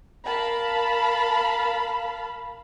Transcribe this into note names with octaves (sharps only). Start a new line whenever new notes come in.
A#4 F5 A5 B5